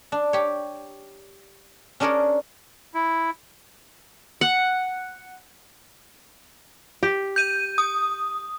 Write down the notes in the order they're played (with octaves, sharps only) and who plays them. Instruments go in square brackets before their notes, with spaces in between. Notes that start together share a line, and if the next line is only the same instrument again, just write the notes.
[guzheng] D4
G4 C#5
C#4 D4 G#4 A#4 C#5 D5
[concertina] E4
[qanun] F#5
[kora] G4
[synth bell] G6 D#7
D#6